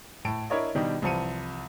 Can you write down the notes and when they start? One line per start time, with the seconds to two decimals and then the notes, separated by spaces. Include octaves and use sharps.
0.25 A2 A5 D7
0.50 D4 E4 A#4 C#5 D#5
0.75 B2 D#3 G3 D4 D#4 G4
1.02 C2 E3 F3 A5 C#7 D#7